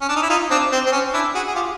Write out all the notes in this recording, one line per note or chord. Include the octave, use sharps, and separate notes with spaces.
C#4
D4
D#4
E4
D#4 F4
C4 D4
C4
C4
C#4
D4 E4
F#4 G#4
G#4
F4 G4